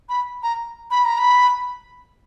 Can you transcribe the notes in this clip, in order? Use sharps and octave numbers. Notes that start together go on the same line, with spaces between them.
B5
A#5
B5
A#5
B5